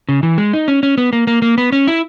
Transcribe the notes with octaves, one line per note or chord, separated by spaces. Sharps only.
C#3
E3
G#3
D#4
C#4
C#4
B3
A#3
A#3
A#3
B3
C#4
E4